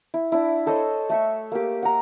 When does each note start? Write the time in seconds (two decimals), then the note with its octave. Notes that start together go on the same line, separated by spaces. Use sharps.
0.14 E4
0.32 D4 E4
0.67 A4 C5 C#5 D#5
1.10 A3 E5 C#6
1.52 A#3 G4
1.83 F#5 A#5